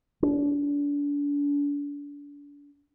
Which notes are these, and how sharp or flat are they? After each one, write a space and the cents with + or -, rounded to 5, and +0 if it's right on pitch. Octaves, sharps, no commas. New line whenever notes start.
D4 -35